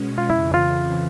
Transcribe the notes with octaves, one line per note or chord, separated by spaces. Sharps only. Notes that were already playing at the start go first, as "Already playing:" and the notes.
Already playing: B2 G#3 C#4
F4
F2 C#3 E3 E4
F4